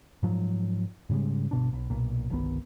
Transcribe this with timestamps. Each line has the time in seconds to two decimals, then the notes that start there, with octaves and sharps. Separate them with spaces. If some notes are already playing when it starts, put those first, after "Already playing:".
0.23 G#2 F3 F#3
1.09 G#2 C#3 G3 G#3
1.51 G1 B2 D4
1.73 B1
1.90 B1 A#2
2.30 G1 C2 D#3 B3